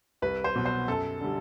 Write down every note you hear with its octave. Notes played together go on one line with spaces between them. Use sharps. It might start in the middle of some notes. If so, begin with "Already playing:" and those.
C2 B4
C5
B2 F#3 B3
C5
F#2 A4
D3 G3